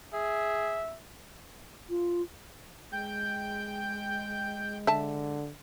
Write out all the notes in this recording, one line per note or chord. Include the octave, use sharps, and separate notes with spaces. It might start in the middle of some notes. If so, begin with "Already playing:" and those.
G#4 E5
F4
G#3 G5 G6
D3 E5 A5